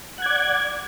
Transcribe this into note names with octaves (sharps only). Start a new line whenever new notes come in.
D5 F#5 G#6